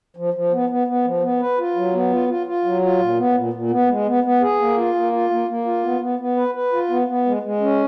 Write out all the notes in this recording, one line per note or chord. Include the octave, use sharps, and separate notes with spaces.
F3
F3
B3
B3
B3
F3
B3
B4
F4
F#3
B3
F4
F4
F4
F#3
F4
A#2
B3
A#2
A#2
B3
G#3
B3
B3
G#4
A#3
F4
A#3
F4
A#3
A#3
F4
B3
B3
B3
B4
B4
F4
B3
B3
G#3
G#3
C#4